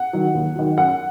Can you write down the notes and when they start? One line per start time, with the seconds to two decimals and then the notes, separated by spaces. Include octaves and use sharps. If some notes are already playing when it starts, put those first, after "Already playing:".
Already playing: F#5
0.13 D#3 F#3
0.35 D#2
0.56 D#3 F#3
0.77 F#2 F#5